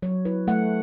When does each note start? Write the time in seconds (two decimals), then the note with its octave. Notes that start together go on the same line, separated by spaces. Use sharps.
0.02 F#3 C#5
0.25 E4 B4
0.48 A3 F#5